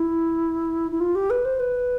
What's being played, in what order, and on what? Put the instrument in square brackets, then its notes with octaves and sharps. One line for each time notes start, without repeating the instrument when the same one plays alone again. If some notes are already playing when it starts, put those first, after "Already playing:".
Already playing: [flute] E4
E4
F4
G4
B4
C5
B4